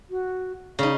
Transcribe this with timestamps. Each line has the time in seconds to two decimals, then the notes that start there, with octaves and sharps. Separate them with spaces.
0.10 F#4
0.79 C#3 D#4 F5